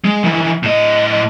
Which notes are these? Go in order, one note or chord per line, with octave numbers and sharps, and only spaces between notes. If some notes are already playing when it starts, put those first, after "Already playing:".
G#3
D#3 E3
A2 D#5